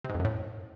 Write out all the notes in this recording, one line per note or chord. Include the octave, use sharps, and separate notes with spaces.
C3
G#2
F2
F#2
A2